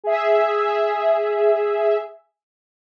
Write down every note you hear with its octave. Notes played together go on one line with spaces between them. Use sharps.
G#4 E5